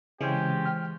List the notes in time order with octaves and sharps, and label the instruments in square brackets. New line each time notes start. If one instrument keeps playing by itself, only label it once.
[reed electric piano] C#3 [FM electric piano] E3 G#3 [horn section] C4 C#4 G4
[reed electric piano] G5 F6